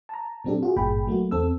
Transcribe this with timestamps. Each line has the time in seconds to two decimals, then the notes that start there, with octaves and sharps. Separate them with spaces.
0.09 A5 A#5
0.44 A#2 F#3 C4 D4 G4 A4
0.63 F4 F#4 G#4
0.76 G#1 G2 A#2 G#4 G5 B5
1.07 F#3 A3 A#3 F#4
1.31 E2 C4 A4 E6